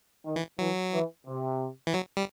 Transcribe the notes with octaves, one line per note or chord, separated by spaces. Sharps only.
D#3
E3
E3 F#3
E3
C3
E3
F#3
G3